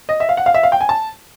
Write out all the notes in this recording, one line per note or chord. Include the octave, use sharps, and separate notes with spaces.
D#5
E5
F5
F#5
F5
E5
F5
G5
G#5
A5